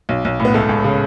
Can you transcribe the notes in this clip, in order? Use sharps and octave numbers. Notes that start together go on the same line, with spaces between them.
B1
B1
A2
B3
C#2 A3
C#2
C#3